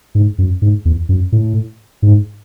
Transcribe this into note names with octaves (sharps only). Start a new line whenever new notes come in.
G#2
F#2
G#2
E2
F#2
A2
G#2